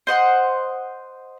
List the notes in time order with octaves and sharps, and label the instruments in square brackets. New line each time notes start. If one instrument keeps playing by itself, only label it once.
[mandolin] C5 D#5 F#5 C6